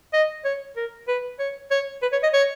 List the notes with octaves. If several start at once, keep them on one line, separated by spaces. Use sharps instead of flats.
D#5
C#5
A#4
B4
C#5
C#5
B4
C#5
D#5
C#5